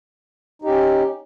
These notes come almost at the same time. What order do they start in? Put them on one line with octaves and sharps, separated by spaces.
D#4 G4 C#4